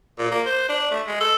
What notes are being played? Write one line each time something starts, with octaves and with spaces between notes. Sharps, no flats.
A#2
A#3
C5
D4
A3
G#3
A4